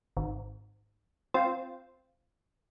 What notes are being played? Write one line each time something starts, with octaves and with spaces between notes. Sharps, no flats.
G#1
C4 F4